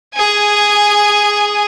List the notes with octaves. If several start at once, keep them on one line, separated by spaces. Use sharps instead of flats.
G#4 G#5